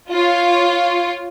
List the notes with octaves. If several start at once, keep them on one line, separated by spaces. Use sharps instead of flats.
F4 C#5